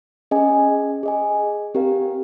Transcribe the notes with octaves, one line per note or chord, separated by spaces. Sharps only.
C#4 G#4 D#5 G#5
G#4 D#5 G#5
C4 G4 A#4 F5